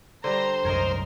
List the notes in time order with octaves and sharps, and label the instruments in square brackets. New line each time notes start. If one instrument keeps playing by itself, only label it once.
[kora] D3 G3 [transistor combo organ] C5 [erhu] A#5
[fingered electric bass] C2 F#2 [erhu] A#4 [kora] C#5 D#5